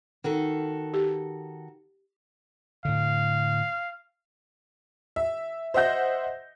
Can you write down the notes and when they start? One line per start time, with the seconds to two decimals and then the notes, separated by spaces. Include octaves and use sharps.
0.24 D#3 F#4 A4
0.94 G4
2.85 A2 D3 F5
5.16 E5
5.74 C5 D#5 E5 F#5 G6 A#6